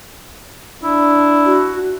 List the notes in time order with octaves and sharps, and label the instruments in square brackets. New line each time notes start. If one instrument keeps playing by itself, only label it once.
[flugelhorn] D4 [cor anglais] E4
[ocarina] F#4